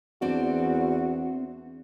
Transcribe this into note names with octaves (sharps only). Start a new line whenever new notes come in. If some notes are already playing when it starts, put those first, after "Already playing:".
E2 C4 D4 F#4 D5